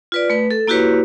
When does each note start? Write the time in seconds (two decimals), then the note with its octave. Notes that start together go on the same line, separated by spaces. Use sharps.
0.12 F4 B4 D5
0.30 A3 B4
0.51 A4
0.67 A#3 E4 F#4 G4 B4 C#5